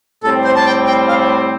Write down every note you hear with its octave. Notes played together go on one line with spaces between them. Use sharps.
A2 G3 C4 A4
C5
A5
G5
G5
F5